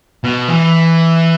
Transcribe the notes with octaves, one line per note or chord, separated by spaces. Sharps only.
B2
E3